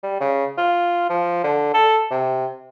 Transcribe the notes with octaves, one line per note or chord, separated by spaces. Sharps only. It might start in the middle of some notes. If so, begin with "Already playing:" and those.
G3
C#3
F4
F3
D3
A4
C3